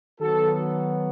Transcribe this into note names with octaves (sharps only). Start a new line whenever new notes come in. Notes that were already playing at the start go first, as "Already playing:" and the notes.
D#3 F#3 B3 F#4 A4